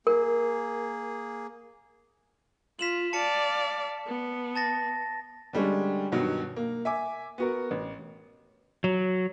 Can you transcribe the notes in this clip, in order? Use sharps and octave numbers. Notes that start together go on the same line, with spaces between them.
A#3 G#4 A#4
F4 B6 E7 F#7
D5 F5 A5 C#7
B3
A5 A6 A#6
D3 G3 G#3 C#4
G2 B2 D#3 F#3
A#3
E5 G#5 D6
B3 F#4 A#4
A1
F#3